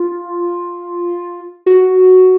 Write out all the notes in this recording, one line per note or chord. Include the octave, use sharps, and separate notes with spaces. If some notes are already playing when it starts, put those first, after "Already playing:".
Already playing: F4
F#4